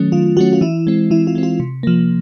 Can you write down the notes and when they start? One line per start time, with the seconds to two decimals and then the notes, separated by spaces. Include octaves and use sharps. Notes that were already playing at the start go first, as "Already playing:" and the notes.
Already playing: D#3 F#3 A3 C#4
0.12 D#3 F4
0.37 F#3 A3 C#4 F#4
0.53 F4
0.61 E3 E4
0.87 G#3 C4
1.11 E3 E4
1.27 F4
1.35 G#3 C4
1.43 F4
1.60 C3
1.83 F3 A#3